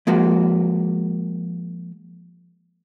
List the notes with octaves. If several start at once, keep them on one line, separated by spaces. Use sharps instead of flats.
F3 G#3 A#3 F#4